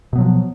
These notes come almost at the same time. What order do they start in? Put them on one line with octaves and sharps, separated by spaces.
B2 B3 F#3 F3